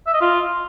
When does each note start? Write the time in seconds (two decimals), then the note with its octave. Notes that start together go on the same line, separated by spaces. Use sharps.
0.07 E5
0.14 D#5
0.21 F4